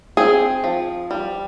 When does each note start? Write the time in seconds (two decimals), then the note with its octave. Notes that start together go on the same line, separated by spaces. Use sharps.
0.17 C4 G#4
0.64 F3
1.11 G3